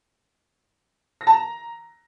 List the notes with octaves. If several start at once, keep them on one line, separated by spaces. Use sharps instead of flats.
A#6
A5
A#5